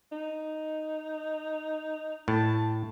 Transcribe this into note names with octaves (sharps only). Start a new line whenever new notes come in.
D#4
A2 A5